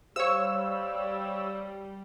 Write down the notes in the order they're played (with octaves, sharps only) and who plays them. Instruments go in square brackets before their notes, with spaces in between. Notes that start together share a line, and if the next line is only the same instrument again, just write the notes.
[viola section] G3 [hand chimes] G4 C5 F5 [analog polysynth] C#5 E6